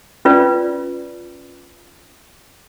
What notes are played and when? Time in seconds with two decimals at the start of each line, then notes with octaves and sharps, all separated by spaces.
0.25 C#4 F4 B4 D5